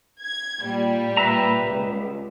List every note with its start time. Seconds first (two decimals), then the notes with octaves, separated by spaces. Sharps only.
0.22 G#6
0.61 A#2 G3
1.17 B4 E5 A#5
1.66 C#2